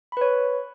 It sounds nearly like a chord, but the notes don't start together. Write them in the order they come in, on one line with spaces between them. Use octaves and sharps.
B5 B4 C#5